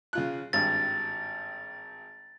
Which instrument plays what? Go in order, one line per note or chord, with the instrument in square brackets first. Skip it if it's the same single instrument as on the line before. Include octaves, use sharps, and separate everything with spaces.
[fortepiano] C#3 F4 F#6
[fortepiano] G#1 G2 [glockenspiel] A6